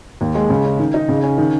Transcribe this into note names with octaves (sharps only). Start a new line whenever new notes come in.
D#2
G#3
C#3
C#4
D#3
D#4
C#3
C#4
D#3